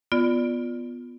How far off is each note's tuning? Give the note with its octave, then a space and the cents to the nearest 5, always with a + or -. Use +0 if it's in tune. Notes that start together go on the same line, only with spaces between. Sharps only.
B3 +0 F4 +0 D5 +0